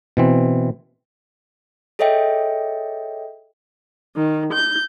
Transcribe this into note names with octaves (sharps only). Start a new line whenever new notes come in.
B2 E3 C4
G#4 A4 C#5 D#5 E5 G5
D#3
G6